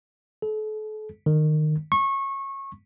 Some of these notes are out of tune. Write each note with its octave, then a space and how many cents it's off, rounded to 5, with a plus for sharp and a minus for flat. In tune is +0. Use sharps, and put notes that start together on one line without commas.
A4 -40
D#3 -25
C#6 -20